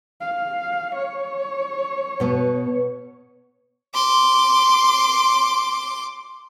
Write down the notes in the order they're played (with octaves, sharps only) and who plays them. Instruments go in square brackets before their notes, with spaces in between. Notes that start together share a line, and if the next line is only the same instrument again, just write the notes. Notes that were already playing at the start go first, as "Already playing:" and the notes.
[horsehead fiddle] F5
C#5
[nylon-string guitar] B2 B3 A5
[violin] C6 D6